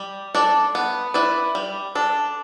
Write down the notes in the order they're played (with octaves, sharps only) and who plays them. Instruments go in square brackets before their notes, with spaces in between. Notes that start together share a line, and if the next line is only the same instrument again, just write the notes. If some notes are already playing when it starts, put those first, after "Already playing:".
Already playing: [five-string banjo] G3
D4 A4 D5
B3
E4 B4 D5
G3
D4 A4